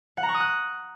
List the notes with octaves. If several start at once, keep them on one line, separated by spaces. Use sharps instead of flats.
F#5
A#5
C#6
D#6
F#6